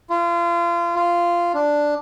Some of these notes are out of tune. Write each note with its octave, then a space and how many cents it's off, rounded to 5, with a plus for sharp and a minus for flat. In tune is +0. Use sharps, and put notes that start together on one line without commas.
F4 -30
F4 -10
D4 +0